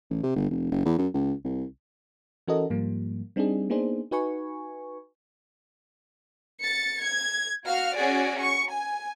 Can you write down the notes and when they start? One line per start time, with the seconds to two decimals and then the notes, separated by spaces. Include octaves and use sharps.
0.10 A1
0.23 C3
0.36 G1
0.51 F1
0.71 F#1
0.85 E2
0.98 F#2
1.14 C#2
1.45 C2
2.48 E3 C#4 F#4 A4 A#4 D#5
2.70 G#2 F3 G3 A#3
3.36 G3 C4 D4 D#4 G#4
3.70 A#3 B3 D4 D#4 G#4 C5
4.11 D#4 F#4 B4 G#5 C#6
6.63 A6 C#7
7.02 G#6
7.66 F#4 F5 F6
7.95 C#4 F#4 G#4 D5
8.40 C#6
8.71 G#5